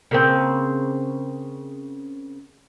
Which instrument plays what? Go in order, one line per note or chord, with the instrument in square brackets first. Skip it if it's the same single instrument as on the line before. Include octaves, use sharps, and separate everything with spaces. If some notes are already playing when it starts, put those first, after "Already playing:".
[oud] C#3 A#3 C4